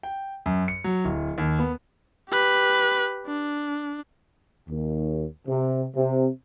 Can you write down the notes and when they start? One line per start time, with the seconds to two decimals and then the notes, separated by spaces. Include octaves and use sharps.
0.03 G5
0.46 F#2
0.68 C#7
0.84 F#3
1.05 D1
1.38 D#2
1.59 B3
2.29 G4 B4
3.27 D4
4.70 D#2
5.48 C3
5.96 C3